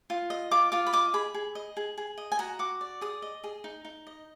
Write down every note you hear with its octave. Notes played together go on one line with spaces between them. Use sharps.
F4
D#5
F4 D6
F4 D6
B5
D#5 D6
G#4 B5
G#4
D#5
G#4
G#4
D#5
G#5
F#4 A#5
F#4 D6
D5
G#4 D#6
D#5
G#4
D#4
D#4
D#5